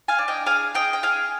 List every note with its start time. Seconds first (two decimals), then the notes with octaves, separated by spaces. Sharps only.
0.08 F5 G#5
0.18 D4
0.28 D#5 G5
0.46 G#4 F5 G#5
0.75 G#4 D#5 G5
0.93 G5
1.03 G#4 F5 G#5